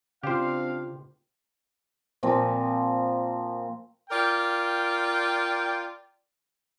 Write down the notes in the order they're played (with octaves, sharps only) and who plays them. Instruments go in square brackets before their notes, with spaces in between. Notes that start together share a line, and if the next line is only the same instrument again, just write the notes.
[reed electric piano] C#3 F4 [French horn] C4 [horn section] D4 F5 [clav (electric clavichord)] G4 C5
[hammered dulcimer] A#2 F3 A#3 C4
[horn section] F4 A#4 D5 G5